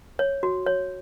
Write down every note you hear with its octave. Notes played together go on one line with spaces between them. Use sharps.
C#5
F#4
C#5